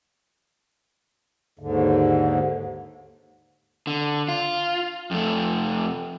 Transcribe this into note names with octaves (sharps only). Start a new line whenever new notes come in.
D#2 G#2 D3
D3
F4
F2 A3